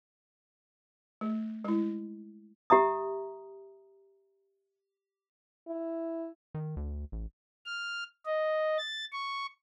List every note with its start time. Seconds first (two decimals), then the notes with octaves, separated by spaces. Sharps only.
1.21 A3
1.64 G#3 E4
2.70 G4 E5 A#5 D#6
5.68 E4
6.54 D#3
6.77 D2
7.12 A1
7.66 F6
8.26 D#5
8.78 A6
9.12 C#6